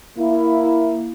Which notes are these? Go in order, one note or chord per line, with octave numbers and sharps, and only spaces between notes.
A#3 E4